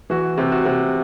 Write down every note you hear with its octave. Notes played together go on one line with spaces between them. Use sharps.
E3 F#4
C3
F#4
C3